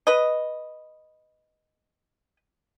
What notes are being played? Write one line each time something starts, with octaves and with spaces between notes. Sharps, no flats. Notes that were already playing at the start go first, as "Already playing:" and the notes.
B4 D#5